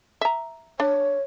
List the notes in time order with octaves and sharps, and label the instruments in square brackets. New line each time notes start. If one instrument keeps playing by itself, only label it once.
[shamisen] E5 A#5
[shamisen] D4 [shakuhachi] C#5